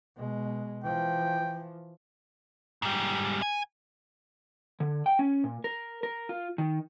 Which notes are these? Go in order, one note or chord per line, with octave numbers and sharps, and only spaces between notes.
B2 G#3
E3 F3 G5
G#2 G3
G#5
D3
G5
C#4
A#2
A#4
A#4
F4
D#3